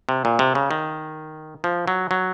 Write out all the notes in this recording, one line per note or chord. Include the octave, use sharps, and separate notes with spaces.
C3
A#2
C3
C#3
D#3
F3
F#3
F#3